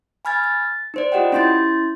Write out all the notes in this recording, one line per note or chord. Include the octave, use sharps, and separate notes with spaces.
G#5 B5 F6 G#6 A6
A6
D#4 C5 D5
F4 G4 D#5 F#5 G5
C#4 E4 C6 G6 A6